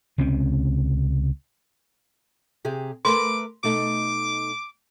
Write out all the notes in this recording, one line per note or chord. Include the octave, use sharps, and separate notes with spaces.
C#2 C3 C4 C#4
C3 G4 G#4
A3 A#4 B4 C6 D6
B2 A3 D#4 D6